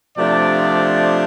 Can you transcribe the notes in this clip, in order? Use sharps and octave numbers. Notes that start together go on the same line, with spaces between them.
C3 F3 A3 D4 D5